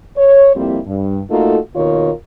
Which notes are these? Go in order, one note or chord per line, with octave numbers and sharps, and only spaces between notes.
C#5
F2 G3 A#3 C4 E4 G4
G2
A3 A#3 D#4 F4 F#4 A4
D#2 B2 D#3 F4 A#4 C#5